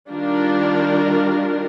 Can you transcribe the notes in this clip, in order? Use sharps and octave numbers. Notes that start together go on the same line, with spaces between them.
D#3 G3 D4 F4 A#4